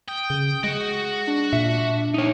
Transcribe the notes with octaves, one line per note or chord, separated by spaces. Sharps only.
G5 D#6
C#3
G#3 F#4
D4
A#2 E5
D#4 C#5